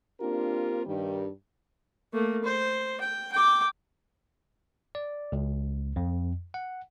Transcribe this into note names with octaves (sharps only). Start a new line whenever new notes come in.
A#3 C4 D4 F4 G4 A#4
G2 D#3 G3
A3 A#3
C5
G5
G5 D6
D5
C#2
F2
F#5